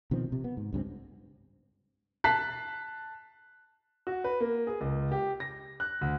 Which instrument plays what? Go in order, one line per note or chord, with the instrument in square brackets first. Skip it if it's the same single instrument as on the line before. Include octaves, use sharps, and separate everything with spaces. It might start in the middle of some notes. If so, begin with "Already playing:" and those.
[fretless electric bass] B2 D#3 F3 C4
C3
B3
G#2
C#2 G2 F#3 C4
[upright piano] A5 F#6 B6 C7
[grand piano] F#4
B4
A#3
G#4
C#2
G4
A#6
F#6
D2